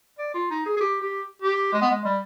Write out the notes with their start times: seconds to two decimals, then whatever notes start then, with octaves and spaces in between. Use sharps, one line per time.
0.19 D5
0.34 F4
0.51 D#4
0.66 G#4
0.77 G#4
0.80 G4
1.02 G4
1.42 G4
1.73 G#3
1.82 B3
1.90 G#3
2.05 G3